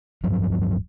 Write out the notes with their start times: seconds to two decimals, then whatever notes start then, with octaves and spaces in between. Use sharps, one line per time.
0.23 D1 G2 F3 F#3